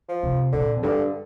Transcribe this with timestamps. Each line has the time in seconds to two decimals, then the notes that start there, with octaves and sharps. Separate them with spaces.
0.09 F3
0.23 C3
0.52 A#2 D3
0.76 F2
0.83 G2 D3